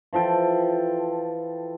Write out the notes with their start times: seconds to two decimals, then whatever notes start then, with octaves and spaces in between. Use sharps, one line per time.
0.13 E3 F3 A4 G5